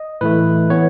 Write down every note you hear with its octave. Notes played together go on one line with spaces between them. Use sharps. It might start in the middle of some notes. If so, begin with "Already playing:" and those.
Already playing: D#5
A2 E3 A3 B4
E3 B3 C#5